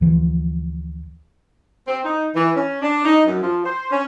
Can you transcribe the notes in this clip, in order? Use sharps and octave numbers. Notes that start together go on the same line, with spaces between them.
D2 E3 F3
C4
D#4
E3
C#4
D4
D#4
F#2
F3
C5
C#4